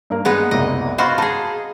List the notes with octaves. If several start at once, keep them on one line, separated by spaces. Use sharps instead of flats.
G2 A#3 A#4
G#3 B3 D#4
F#1 C2 D#5
F4 F#4 C5 D#5 B5 C6
D#4 G#4 A5 B5